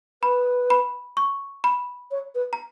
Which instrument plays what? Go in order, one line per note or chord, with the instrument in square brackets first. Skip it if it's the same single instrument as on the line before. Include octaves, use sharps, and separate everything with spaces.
[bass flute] B4 [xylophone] B5
[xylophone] B5
C#6
B5
[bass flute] C#5
B4
[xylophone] A#5